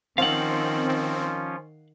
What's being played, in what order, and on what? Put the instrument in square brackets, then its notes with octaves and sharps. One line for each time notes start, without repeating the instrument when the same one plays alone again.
[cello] D#3 [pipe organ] F3 C#4 F4 [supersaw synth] C4 [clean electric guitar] F5 F#5